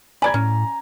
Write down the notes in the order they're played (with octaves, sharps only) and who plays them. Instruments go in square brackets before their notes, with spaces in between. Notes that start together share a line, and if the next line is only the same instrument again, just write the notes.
[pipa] D5 B5 [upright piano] G#5 G#6 [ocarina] A#5
[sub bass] A2 [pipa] C#4